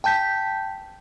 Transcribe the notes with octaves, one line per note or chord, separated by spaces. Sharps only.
G5 A5 G6 B6